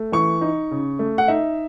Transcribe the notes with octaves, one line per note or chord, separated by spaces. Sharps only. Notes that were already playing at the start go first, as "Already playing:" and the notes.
Already playing: A3
E3 C#6
D#4
C#3
A3
F#5
D#4 E5